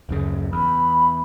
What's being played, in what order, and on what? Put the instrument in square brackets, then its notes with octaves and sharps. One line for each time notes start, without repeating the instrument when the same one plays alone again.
[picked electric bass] D1 F#2 C#3
[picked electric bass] E2 [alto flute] B5